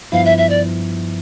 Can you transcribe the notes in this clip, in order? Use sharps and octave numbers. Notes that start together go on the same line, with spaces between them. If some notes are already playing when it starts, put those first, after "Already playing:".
G2 F3 B3 E4 F5
E5
E5
D5